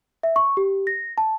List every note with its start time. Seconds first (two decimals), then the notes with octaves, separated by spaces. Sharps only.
0.23 E5
0.36 C#6
0.57 G4
0.87 A#6
1.18 A5